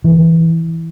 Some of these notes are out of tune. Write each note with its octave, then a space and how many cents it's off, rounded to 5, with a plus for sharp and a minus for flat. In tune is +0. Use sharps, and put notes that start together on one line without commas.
E3 -5